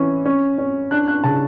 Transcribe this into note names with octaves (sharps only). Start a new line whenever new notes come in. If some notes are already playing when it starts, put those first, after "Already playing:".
Already playing: E3 C#4
C#4
C#4
D4 F#6
F#6
C#3 A5